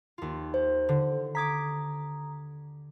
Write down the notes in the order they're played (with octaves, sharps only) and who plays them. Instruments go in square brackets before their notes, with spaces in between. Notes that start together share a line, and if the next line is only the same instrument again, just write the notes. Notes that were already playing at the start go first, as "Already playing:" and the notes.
[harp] D#2 F4
[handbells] C5
[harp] D3
[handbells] A#5 D#6 [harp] D6 G#6 B6